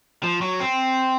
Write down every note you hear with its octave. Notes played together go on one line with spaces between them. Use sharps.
F3
F#3
C4